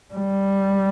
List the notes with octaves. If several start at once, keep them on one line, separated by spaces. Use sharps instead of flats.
G3